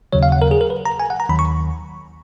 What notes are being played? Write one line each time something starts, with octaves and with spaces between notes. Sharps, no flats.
D#2 C#3 F#3 C#5
F5
F#5
A#4
G#4
A#4
B4
A#5
G#5
F#5
A#5
D#2 D#3 F#3 B5
C#6